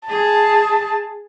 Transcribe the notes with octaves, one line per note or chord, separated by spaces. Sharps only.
G#4 A5